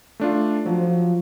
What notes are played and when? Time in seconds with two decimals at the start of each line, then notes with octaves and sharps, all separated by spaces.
0.20 A3 D4 F4
0.66 F3 F#3